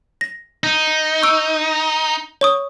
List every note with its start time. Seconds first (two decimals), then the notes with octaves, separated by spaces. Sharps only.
0.21 A#6
0.64 D#4
1.23 C#6 E6 D7
2.41 C#5 C#6 D#6